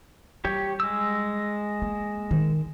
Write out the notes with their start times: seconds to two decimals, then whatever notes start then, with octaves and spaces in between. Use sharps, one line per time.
0.45 G3 G4 C#5
0.80 G#3 E6
1.82 A#3
2.31 D#3